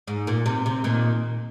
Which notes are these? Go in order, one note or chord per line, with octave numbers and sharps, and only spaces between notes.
G#2
A#2
C3
C3
A#2 D#3